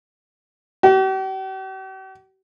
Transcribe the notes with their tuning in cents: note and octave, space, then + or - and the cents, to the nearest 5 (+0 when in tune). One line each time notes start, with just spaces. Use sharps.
G4 -45